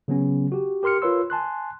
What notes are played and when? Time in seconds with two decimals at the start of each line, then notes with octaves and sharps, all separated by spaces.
0.08 C#3 F#3 B3 C#4
0.52 F#4 G4
0.83 G4 A#4 C6 F6 C#7
1.02 F4 A#4 B4 C#5 C6 E6
1.30 G#5 A5 C6 F#6